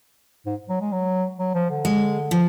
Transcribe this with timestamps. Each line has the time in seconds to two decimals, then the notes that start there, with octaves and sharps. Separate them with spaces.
0.46 G#2
0.69 F#3
0.81 G#3
0.92 F#3
1.39 F#3
1.54 F3
1.70 D3
1.85 G#3
2.31 F3